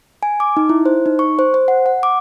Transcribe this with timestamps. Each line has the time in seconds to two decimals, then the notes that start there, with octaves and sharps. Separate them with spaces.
0.23 G#5
0.40 D6
0.57 D#4
0.69 E4
0.86 C5
1.06 D#4
1.19 C#6
1.39 C5
1.54 C5
1.68 F#5
1.86 F#5
2.03 D6